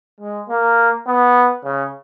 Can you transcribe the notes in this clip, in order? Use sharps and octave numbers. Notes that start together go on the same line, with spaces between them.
G#3
A#3
B3
C#3